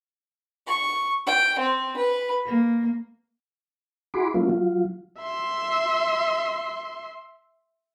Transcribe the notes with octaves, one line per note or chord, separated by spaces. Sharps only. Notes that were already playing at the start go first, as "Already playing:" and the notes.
C#6
G5
C4
B4
A#3
E4 F#4 G#4 B5 C6 D6
F#3 A3 A#3 C#4 E4 F4
F#3 F4
E5 C6